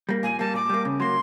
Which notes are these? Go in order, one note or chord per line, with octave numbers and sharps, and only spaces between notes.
G3 A#3
A#2 G#5
G3 A#3 A5
A#2 D6
G3 A#3
C#3
F#3 A#3 C6